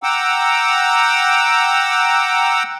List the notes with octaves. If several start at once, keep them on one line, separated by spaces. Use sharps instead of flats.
F#5 G5 A#5 D6 E6